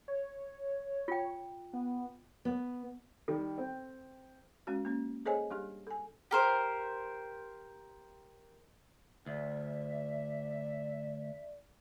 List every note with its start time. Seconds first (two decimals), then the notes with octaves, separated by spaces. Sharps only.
0.08 C#5
1.08 F4 G5
1.73 B3
2.45 B3
3.28 D#3 G3 A4
3.58 C4 G5
4.67 G#3 C#4 F#4
4.85 A#3 C#4
5.25 G#4 A4 C5 C#5 D#5 G#5
5.51 G3 D4 G4
5.87 A4 G#5
6.31 G4 A#4 C5
9.26 D2 D5 E5